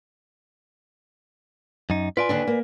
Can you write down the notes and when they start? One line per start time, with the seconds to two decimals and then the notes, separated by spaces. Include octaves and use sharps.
1.90 F#2 D#4
2.17 F4 B4 D5 G#5
2.29 D#2 D3 D4
2.47 A#3